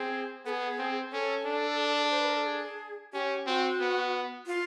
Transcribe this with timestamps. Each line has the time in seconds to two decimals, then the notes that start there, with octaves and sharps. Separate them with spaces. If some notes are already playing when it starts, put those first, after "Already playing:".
Already playing: C4 G#4
0.45 B3 A4
0.49 G#4
0.79 C4
1.13 C#4 A4
1.46 D4
2.11 C5
2.19 B4
2.28 A#4
2.37 A4
2.46 G#4
3.13 C#4 G4
3.46 C4 F#4
3.80 B3
4.47 F4